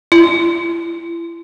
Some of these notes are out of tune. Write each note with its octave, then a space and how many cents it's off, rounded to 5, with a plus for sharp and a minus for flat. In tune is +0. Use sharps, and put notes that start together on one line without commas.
E4 +35